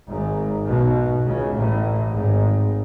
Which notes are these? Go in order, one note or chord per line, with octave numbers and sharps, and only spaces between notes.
G#1 G#2
B1 B2
C#2 C#3
A1 A2
G#1 G#2